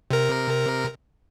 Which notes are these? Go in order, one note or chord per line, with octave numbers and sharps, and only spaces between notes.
C3 A#4